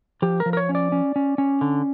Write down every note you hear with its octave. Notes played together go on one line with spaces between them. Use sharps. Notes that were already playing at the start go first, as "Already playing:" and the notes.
F3 G4
A#4
F3
A#4
C#5
C#4
D5
C#4
C#4
C#4
D3